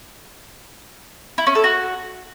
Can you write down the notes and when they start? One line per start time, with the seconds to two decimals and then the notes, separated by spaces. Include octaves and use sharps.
1.38 E4
1.47 C#4
1.55 A4
1.64 F#4